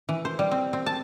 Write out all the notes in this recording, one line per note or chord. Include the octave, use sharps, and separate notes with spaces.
E3
C5
G3
C4
C4
A5